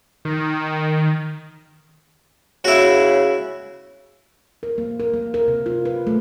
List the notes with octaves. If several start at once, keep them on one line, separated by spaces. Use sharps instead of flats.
D#3
C#3 E4 F#4
A#4
A#3
A#4
A#3
A#4
C3
F4
B4
A3